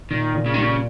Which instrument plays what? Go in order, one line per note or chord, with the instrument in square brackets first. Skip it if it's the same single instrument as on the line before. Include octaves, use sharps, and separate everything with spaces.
[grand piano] A#2 [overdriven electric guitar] D#3
[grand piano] A#2
[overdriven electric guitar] C#3
[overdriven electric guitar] D#3 [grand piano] G3
[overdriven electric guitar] C#3